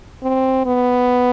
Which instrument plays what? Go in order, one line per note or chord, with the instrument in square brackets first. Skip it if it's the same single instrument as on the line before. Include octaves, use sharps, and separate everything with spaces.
[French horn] C4
B3